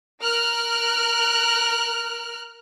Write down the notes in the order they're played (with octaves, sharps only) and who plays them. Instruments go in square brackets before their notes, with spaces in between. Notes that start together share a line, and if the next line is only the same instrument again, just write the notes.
[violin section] A#4 F6 F#6